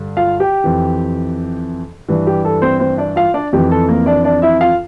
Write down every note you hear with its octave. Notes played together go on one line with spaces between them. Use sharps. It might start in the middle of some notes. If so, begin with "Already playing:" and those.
Already playing: G2 D3
F4 F5
G4 G5
F2 E3
G2 E3
G4
A4
C4 C5
C4 C5
D4 D5
F4 F5
D4 D5
F2 E3 G4
A4
A#3 A#4
D4 D5
D4 D5
E4 E5
F4 F5